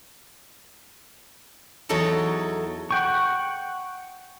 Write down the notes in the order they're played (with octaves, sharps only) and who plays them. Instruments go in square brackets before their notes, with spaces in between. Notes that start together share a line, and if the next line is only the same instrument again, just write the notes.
[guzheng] E2 F#3 D#4 A4 D#5
[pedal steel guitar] F#5 G5 C#6